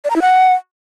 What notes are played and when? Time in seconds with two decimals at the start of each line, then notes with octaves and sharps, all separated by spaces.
0.05 D5
0.10 A#5
0.16 E4
0.22 F#5